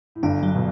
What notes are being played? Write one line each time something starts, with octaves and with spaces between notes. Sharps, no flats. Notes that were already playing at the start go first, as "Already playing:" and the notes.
A2
G1 G2 D4
F#3
B2